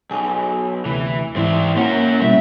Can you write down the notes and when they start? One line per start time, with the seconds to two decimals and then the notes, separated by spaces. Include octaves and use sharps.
0.11 B1 G#4
0.85 D2 C3 E3
1.36 G#2 E3 C4 E4
1.77 A#3 C#4 E4 A#4 F#5
2.22 B2 G3 E5